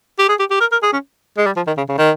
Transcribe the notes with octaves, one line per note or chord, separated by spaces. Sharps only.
G4
G#4
G4
G4
A#4
A#4
G#4
C#4
G#3
G3
F3
D#3
C#3
C#3
D#3